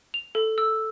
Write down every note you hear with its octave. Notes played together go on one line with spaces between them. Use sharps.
F7
A4
E6